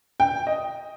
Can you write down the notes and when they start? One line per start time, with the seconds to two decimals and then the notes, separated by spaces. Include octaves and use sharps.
0.20 G5
0.47 D#5